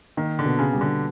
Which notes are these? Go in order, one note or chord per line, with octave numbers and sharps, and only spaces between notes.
D#3 A#3
D3
B2
C#3
G3
D3